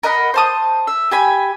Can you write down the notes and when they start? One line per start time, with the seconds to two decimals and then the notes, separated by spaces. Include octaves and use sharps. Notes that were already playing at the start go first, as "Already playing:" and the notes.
0.03 A#4 D#5 F#5 B5
0.34 C5 A5 D#6
0.87 E5
1.11 G4 G#5 B5